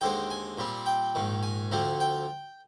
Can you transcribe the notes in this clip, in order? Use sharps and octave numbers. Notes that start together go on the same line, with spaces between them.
D#2 D3 G#3 C4 G5
G#5
A#2 G3 C4
G5
A#1 G#2 D#3
G#5
D2 D3 F3 C4
G5